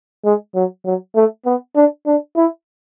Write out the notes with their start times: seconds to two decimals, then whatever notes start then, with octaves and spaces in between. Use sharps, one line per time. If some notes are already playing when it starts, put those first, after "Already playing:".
0.25 G#3
0.55 F#3
0.85 F#3
1.15 A3
1.46 B3
1.76 D4
2.06 D4
2.37 E4